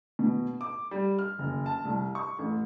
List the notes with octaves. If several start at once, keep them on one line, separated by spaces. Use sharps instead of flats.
B2
D6
G3
F6
F#1
A5
C2
C#6
A1